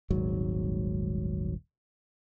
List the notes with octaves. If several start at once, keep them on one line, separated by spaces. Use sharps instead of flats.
D#1 G#1 G#2 F#3